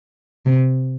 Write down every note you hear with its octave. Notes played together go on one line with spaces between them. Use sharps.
C3